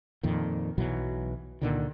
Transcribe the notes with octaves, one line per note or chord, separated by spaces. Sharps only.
F2 A#2 D#3
B1 B2 E3 F#3
C#2 A#2 D3 D#3